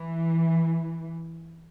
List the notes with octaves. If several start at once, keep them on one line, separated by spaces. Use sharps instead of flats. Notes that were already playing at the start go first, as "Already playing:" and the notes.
Already playing: E3